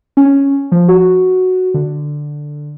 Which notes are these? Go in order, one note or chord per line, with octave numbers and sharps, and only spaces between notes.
C#4
F3
F#4
D3